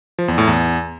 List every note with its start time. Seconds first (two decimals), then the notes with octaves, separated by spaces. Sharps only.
0.19 F3
0.28 E2
0.38 A2
0.47 E2